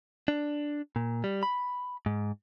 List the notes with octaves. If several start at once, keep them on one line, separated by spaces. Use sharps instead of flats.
D4
A#2
G3
B5
G#2